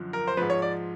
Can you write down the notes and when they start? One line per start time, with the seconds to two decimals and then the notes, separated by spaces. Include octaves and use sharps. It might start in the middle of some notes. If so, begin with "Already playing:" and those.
Already playing: F#2 D3 F3
0.13 A#4
0.28 C5
0.37 G#2 F3 B4
0.50 C#5
0.62 D5